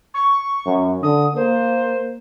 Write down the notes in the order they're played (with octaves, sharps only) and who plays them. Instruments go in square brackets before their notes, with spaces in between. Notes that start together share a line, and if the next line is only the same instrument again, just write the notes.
[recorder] C#6
[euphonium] F#2
[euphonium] D3 [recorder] D#6
[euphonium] A#3 [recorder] C5